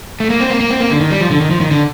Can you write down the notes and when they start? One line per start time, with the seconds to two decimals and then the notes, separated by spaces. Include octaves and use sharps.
0.20 A3
0.30 A#3
0.41 C4
0.50 A#3
0.60 A#3
0.70 C4
0.80 A#3
0.90 D3
1.01 D#3
1.11 G3
1.21 F3
1.31 D3
1.41 D#3
1.51 F3
1.61 D#3
1.71 D3